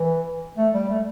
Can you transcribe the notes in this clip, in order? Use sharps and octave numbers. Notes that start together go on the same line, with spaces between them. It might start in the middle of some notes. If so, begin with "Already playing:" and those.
Already playing: E3
A3
G3
A3